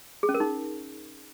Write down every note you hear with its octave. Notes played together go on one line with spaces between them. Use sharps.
G#4
C#4
A#4
D#4